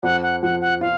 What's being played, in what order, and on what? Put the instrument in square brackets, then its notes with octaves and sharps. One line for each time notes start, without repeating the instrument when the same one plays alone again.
[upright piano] F2 [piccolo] F#5
[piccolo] F#5
[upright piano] F3 [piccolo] F#5
[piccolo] F#5
[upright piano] F4 [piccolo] F5